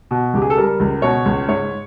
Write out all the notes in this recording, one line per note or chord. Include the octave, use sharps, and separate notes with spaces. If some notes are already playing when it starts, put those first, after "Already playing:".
B2
C#2 G4
G#4
A4
G3 A#4
C#2
B2 C#5
C#2
G#2 C#5